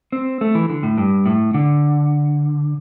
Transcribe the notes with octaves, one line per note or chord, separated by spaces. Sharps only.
C4
A3
E3
D3
A2
G2
A2
D3